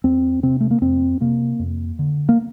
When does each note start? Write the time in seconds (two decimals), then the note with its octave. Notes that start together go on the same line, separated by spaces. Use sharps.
0.04 E2 C4
0.43 C3 C4
0.60 A3
0.71 A#3
0.82 F2 C4
1.21 C3 A#3
1.59 F2
1.99 D3
2.29 A#3